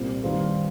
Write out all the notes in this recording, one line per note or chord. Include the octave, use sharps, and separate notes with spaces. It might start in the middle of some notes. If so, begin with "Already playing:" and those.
Already playing: C2 A#2 G3 C4
G2 D#3 G3 C4 F4